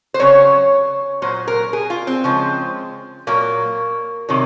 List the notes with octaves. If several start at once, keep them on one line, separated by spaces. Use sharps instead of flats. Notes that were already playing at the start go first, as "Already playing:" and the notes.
C5
C#3 F#3 C#5
A#2 F#3 C5
A#4
G#4
F4
C4
C#3 F3 G#3
A#2 F#3 A#3
C3 D#3 F#3